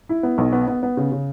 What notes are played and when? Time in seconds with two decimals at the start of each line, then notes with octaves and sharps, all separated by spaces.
0.09 E4
0.23 B3
0.38 B1
0.52 B3
0.68 B3
0.83 B3
0.97 C#3
1.12 C#3